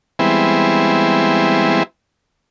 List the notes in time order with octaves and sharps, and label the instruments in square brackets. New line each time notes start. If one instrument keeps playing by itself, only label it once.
[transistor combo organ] E3 G3 G#3 B3 C4 E4